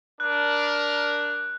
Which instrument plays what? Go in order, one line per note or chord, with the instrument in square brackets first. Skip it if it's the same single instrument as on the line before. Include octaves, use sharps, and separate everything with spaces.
[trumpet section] D4 A#4 [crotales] F#6